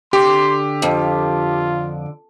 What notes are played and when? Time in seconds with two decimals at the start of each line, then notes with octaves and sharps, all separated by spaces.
0.13 D3 G4 C6 D6
0.82 F2 F4